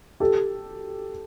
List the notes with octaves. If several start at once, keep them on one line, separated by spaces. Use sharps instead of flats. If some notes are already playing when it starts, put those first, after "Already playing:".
G4 A4